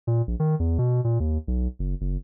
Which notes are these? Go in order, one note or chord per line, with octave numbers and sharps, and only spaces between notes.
A#2
A#1
D#3
E2
B2
A#2
D#2
B1
F#1
F#1